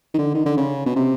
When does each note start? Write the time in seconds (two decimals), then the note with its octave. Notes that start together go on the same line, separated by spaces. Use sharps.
0.14 D#3
0.18 D3
0.35 D#3
0.46 D3
0.57 C#3
0.86 B2
0.96 C3